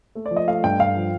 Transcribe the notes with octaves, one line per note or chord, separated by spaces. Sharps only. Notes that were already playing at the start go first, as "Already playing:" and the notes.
A3
D5
F3
D#5
A3 F5
G2 G5
G2 F5
F3